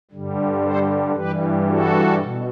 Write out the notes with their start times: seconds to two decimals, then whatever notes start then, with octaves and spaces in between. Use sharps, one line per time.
0.11 G2 D3 G3
0.63 A4 C5
1.15 G2 E3 G3 G4 B4
1.68 F#4 A4
2.20 B2